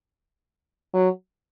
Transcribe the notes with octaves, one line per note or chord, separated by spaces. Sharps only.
F#3